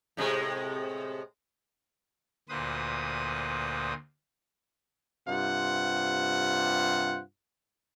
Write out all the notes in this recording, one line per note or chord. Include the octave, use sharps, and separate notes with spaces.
A2 C3 G#3
D2 A#2 B4 C5 D#6
G2 C3 F4 C5 F#5